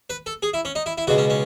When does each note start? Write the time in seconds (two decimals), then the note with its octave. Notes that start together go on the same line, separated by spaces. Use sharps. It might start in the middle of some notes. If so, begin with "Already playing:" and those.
0.10 B4
0.26 A4
0.43 G#4
0.54 E4
0.65 C#4
0.75 D#4
0.86 E4
0.98 E4
1.07 C#2 B2 G#3 F#4
1.18 C#4
1.30 C#4